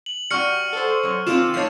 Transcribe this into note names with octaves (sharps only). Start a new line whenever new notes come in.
F#7
G3 F#4 C#6 F6 C#7
A4 C5
F#3 C#5
D#3 G#3 C4 F4 D6 E6 E7
F3 A3 D#4 C#5 C7